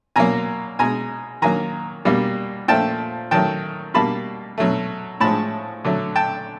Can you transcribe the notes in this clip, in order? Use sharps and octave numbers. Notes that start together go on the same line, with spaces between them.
B2 F#3 A#3 G#5 A#5
B2 G#3 G#5 A#5
D#3 F#3 A#3 G#5 A#5
B2 G3 A#3
A#2 F3 A3 G5 A5
D#3 F#3 A3 G5 A5
B2 G3 A#3 A5 B5
B2 F#3 A3
A2 F3 G#3 A5 B5
D3 F#3 A3
G5 A5